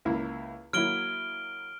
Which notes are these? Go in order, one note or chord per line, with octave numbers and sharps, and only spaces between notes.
C#2 A#3 E4
F#3 A#3 E4 F6 D7 G7